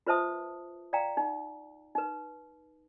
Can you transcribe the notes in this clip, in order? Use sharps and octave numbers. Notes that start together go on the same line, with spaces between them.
F4 B4 C5 E5 A5 D#6
D5 F5 G5 A#5
D#4
D#4 B4